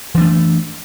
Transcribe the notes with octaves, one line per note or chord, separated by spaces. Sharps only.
E3 A3 D4